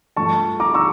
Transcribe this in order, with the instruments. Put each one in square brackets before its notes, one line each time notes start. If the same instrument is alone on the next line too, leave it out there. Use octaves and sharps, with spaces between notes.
[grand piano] G2 F3 A3 A5 C#6
A#5 D6
C#6 E6